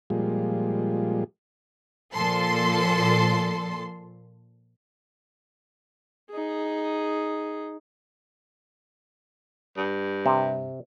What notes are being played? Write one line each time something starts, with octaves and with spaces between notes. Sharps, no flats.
A#2 F3 G3 G#3
A#2 F3 A4 C6
D#4 G#4
G2
C3